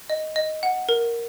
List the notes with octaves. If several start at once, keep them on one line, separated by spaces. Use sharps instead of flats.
D#5
D#5
F#5
A#4